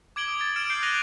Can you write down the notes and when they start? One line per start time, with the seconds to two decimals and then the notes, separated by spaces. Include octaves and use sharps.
0.16 D6 G#6 D7 F#7 G7
0.28 D#6 D7
0.41 A6
0.56 F6 A6 D7 E7
0.70 G6 C7 D7 F#7
0.83 F#6 G6 A#6 D#7 F7 G7